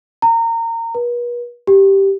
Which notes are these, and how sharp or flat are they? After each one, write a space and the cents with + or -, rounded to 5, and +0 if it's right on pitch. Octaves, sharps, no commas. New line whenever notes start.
A#5 -25
B4 -45
G4 -5